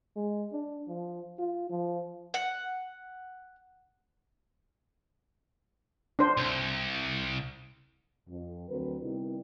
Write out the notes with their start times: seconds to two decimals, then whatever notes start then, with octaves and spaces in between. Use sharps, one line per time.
0.16 G#3
0.52 D4
0.88 F3
1.38 F4
1.70 F3
2.34 F#5
6.19 D4 C5
6.38 C2
8.29 F2
8.69 D2 F#3 C4 A#4 B4
9.02 C3 D#3 G3 B3 E4